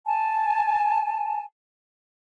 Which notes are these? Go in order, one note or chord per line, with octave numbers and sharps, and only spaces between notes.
G#5 A5